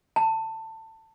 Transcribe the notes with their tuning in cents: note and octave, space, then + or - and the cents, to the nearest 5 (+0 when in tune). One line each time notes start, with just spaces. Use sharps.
A5 +20